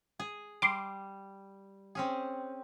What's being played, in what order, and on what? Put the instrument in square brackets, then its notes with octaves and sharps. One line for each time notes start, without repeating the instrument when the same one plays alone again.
[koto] G#4
[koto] G3 [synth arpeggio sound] C6 D6
[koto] C4 C#4 G#4